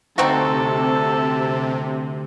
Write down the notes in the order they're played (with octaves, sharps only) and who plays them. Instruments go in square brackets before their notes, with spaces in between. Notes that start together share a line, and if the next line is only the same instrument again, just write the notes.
[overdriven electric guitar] D2 [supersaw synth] C3 [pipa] C4 D#4 F#4 [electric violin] A4